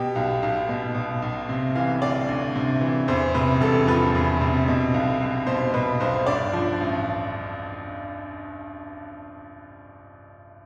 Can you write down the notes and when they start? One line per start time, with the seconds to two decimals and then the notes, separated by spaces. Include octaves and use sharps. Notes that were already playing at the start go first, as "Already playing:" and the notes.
Already playing: B2 G4
0.15 B1
0.43 B1
0.69 B2
0.95 B2
1.22 B1
1.49 C3
1.75 E3 F5
2.02 D2 D5
2.29 D2
2.55 C3
2.81 E3
3.08 E2 C5
3.35 C3 B4
3.60 E1 A4
3.87 F3 B4
4.15 E2
4.41 C3
4.68 B2
4.94 B1
5.21 B1
5.47 B2 C5
5.74 B2 B4
6.00 B1 C5
6.26 G2 D5
6.53 F3
6.81 A1